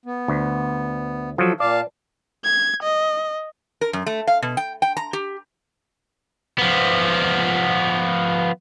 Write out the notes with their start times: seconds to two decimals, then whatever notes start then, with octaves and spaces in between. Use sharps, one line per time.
0.06 B3
0.28 D2
1.38 F3 F#3 A4
1.60 A#2 D5 F5 A5
2.44 G#6
2.83 D#5
3.81 A#4
3.93 F#2
4.06 A3
4.27 F5
4.42 B2
4.57 G5
4.82 G5
4.97 A#5
5.13 G4
6.59 F3 B3